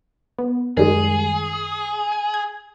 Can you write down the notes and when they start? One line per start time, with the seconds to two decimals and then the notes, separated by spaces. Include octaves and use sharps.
0.39 B3
0.77 F#2 D#3 G3 G#3 G#4
2.12 G#5
2.34 G#6